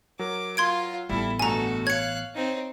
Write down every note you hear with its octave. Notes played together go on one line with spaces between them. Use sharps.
F#3 A#4 D6
F4 C6 G#6 D7
A1 G3 B3 E4 A4
G2 B2 A3 F#4 A4 G#5 A#5
C#5 F5 F#6 G#6 C#7
C4 D#4